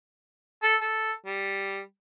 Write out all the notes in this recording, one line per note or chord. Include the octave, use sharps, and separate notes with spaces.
A4
A4
G3